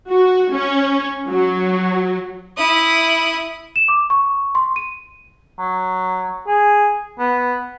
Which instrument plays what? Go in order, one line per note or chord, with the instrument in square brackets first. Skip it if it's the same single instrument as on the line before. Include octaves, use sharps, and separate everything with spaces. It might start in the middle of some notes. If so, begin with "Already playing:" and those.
[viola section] F#4
C#4
F#3
[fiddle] E4 D#6
[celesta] E7
D6
C#6
C6
D#7
[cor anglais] F#3
G#4
B3